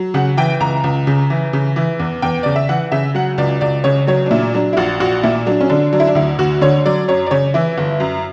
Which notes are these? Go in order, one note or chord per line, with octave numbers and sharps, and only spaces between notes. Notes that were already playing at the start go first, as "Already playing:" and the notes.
Already playing: F#3
C#3 F#5
E3 G5
C#2 A#5
C#2
C#3
E3
C#3
E3
E2
E2 G5
C#3 D5
E5
E3 F#5
C#3 E5
F#3 F#5
C#2 D5
C#2 D5
C#3 C#5
F#3 C#5
D4
A#2 E4
F#3 D4
E4
A#1 F#4
A#1 F#4
A#2 E4
F#3 D4
C#4
D3 D4
F#3 D4
E4
D4
D2 E4
D2 F#4
D3 C#5
F#3 D5
F#2 C#5
D5
C#3 C#5
E3 E4
G1
F#2